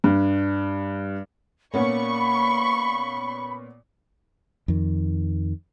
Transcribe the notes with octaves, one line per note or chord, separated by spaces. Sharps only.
G2
A#2 A#3 B3 C#4 B5 C#6
F2 D#3